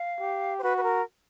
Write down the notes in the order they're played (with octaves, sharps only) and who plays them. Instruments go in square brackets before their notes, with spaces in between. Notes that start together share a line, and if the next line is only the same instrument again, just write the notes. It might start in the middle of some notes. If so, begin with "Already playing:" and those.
Already playing: [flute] F5
[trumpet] G4
[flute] C5
[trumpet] F#4 [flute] B4
[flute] B4
A#4